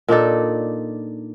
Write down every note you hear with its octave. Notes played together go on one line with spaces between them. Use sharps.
A#2 D4 D#4 A4